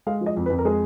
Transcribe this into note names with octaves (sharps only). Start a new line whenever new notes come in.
G#3 F5
F3
D#5
F2
B4
F2
A#4
G#3 G#4